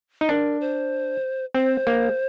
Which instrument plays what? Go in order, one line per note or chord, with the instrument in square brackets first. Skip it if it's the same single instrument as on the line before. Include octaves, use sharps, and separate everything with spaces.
[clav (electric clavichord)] D#4
[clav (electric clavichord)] D4 [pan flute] A#4
[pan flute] C5
[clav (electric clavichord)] C4 [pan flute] C5
[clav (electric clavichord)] A#3